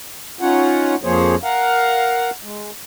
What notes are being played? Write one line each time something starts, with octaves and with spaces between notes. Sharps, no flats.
C#4 D#4 F4 C#5 F#5
F2 F3 A#3 G#4 C5 C#5
A#4 F5 F#5
G#3